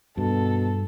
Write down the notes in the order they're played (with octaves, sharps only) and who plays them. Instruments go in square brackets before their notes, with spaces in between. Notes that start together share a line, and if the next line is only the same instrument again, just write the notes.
[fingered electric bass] G2 [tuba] B2 [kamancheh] A4